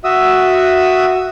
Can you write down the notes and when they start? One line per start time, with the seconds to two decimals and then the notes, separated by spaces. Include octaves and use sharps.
0.04 F#4 E5 D#6 E6